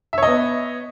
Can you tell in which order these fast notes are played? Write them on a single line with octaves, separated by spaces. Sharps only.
E5 C#5 D#5 B3